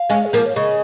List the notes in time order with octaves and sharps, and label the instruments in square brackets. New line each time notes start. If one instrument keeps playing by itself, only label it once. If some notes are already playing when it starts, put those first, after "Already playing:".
Already playing: [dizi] F5
[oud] G#3 C#4
[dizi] G#4
[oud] F3 A#3 [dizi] A#4
[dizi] C#5
[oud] C#3 [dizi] D#5